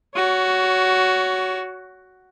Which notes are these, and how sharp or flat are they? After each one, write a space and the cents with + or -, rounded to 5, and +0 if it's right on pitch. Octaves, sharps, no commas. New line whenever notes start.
F#4 +5 C#5 +25